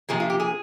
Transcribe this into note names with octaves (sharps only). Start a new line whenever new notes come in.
C3 F3 A#3 G#4
F4
G4
G#4